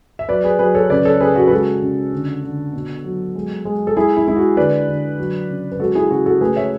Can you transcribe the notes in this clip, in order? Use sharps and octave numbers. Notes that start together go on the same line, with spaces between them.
E5
F#3 B4 D5
G#4 B4
F#3 G#4 B4
A4 C#5
C#3 B4 D5
A4 C#5
C#3 G#4 B4
F#4 A4
B4
G#3 F#4 A4
C#3
D3
D3
B2
F#3
G#3
G#3
A4
G#3 E4 G#4
E4
G#3 E4
F#4
D3 B4 D5
D3
F#3
C#3
B4
G#3 F#4 A4
E4 G#4
C#3 F#4
F#4 A4
A3 G#4 B4
C#5 E5